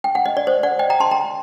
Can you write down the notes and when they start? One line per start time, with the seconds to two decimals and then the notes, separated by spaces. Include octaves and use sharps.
0.04 G5
0.15 F#5
0.26 D#5
0.37 D5
0.47 C5
0.63 D5 F#5
0.79 D#5 G5
0.90 G5 A#5
1.00 A5 C6
1.11 G5 A#5